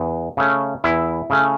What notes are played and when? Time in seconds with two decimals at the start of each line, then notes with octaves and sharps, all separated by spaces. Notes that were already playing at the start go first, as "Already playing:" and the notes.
Already playing: E2
0.37 C#3 A3 C#4
0.84 E2 E4
1.30 C#3 A3 C#4